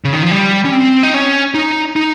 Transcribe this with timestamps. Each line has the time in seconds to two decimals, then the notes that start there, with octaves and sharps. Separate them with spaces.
0.04 C#3
0.13 D#3
0.23 F3
0.31 G3
0.65 C#4
0.72 C4
1.03 D#4
1.14 C#4
1.54 D#4
1.96 D#4